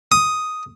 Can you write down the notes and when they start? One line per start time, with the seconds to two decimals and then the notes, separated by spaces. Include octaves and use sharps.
0.12 D#6